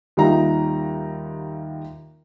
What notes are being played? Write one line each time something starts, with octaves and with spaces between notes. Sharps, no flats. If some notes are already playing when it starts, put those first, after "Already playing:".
D#2 G3 D#4 F4 E5 A#5